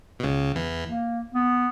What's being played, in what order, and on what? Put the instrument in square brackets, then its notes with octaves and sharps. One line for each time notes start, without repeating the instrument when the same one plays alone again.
[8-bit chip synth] B2
C#2 C#3
E2 E3
[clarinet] A#3
B3